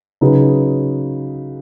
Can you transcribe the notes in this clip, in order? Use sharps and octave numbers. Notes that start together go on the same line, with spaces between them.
C#3 F#3 D#4 G#4 B4